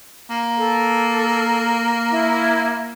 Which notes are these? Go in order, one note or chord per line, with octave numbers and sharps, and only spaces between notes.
A#3
A4
E4